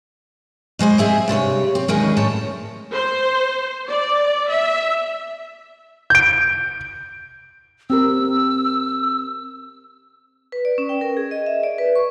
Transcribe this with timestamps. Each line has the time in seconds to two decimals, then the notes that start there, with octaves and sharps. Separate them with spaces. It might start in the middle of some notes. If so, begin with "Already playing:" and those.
0.79 B2 G#3 C5 G#5
0.98 C4 G#4 E5 G#5
1.28 G2 C3 C5 C#5
1.75 C4
1.88 D2 B2 D#3 G#3 C#4
2.17 A2 C4 C#5 A5
2.92 C5
3.88 D5
4.49 E5
6.10 G6 D7
7.90 C4 G4 A#4 E6
10.52 B4
10.65 D5
10.78 C#4
10.89 G5
11.01 A#4
11.17 G#4
11.31 D#5
11.46 E5
11.63 D5
11.78 B4
11.95 C#6